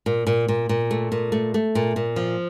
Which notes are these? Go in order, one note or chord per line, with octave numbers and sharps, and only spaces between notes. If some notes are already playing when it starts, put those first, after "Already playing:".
A#2
A#2
A#2
A#2
A3
A#2
A3
A3
A#2
A#2
F3